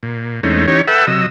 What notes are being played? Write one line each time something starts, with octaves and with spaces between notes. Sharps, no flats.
A#2
E2 G#3 A3 C4 C#4 D#4
E3 C#4 D#4 G4 C#5
A4 B4 E5 F#5 G5 E6
C3 F#3 D#5 E6